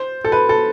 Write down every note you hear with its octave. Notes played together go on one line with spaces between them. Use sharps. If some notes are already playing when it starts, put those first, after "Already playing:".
Already playing: C5
A4
B4
A4